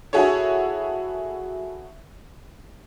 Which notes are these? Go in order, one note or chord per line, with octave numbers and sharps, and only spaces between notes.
E4 F#4 G#4 A4 C#5